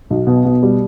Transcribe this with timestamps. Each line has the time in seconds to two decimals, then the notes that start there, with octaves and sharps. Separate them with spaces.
0.10 B1
0.27 B2
0.45 B2
0.63 G3